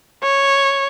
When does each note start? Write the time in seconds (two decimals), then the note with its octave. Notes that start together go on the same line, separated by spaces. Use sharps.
0.23 C#5